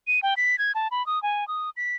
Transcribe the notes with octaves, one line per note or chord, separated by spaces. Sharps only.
D#7
G5
B6
G#6
A5
B5
D#6
G#5
D#6
B6